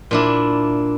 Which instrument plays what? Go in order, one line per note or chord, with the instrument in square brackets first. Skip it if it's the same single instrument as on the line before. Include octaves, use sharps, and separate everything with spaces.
[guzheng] A#2 D4 E4